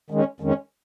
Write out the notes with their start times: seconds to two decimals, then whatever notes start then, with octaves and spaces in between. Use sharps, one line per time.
0.10 D#3 G#3 C#4
0.40 F2 D#3 G#3 C#4